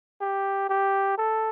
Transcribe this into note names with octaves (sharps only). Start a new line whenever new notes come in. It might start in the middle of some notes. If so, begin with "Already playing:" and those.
G4
G4
A4